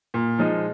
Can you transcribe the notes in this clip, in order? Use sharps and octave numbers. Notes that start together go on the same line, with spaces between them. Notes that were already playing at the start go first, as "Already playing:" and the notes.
A#2
F3 G#3 D#4